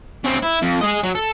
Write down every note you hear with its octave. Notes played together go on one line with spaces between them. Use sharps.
C#3 C4
E4
F2
G#4 D#5
F#3
A4